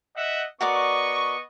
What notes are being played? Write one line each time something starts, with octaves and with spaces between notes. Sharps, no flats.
D#5 E5 F#5
B3 F#4 A#4 D5 D#5 C#6